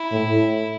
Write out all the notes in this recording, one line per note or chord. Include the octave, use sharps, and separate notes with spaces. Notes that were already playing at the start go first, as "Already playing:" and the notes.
Already playing: E4
A2